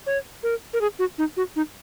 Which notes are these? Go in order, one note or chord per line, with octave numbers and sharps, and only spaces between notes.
C#5
A#4
A#4
G#4
F#4
D#4
F#4
D#4